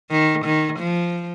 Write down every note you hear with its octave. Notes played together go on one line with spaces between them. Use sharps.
D#3
D#3
F3